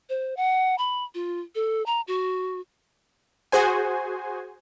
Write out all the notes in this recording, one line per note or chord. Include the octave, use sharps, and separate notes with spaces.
C5
F#5
B5
F4
A4
A#5
F#4
F#4 G#4 C5 G#5